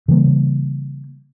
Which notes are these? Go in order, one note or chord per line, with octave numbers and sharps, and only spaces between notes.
C#3 E3 G3 A#3